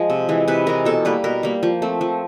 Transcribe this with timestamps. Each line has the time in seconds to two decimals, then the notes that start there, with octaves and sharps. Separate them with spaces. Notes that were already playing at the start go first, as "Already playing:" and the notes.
Already playing: F3 G#3
0.10 C3
0.29 E3 G#3
0.48 C3 B4
0.66 E3 G#3 A#4
0.85 B2 A4
1.05 G3 A#3 B4
1.24 B2 A#4
1.43 G3 A#3
1.63 F3
1.82 A3 C4
2.01 F3